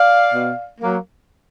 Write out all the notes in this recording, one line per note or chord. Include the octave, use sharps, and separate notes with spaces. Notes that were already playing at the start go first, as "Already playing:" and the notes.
Already playing: D5 F5
B2
F#3 A#3